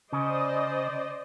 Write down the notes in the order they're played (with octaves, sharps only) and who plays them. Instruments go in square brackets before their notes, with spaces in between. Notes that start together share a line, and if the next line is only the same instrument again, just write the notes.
[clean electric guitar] C#3 [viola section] C5 D5 D#5